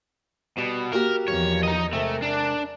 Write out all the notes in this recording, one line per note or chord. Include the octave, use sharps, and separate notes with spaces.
B2 G3
A#3 F#4 G4 A#4
E2 D#3 F3 C#5
D#4 D#5
C3 G#3 A3 A#4
D4